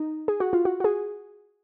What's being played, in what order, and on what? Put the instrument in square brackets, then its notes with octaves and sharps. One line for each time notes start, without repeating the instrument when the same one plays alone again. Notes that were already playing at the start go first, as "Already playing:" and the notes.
Already playing: [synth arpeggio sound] D#4
G#4
F#4
F4
F#4
F#4
G#4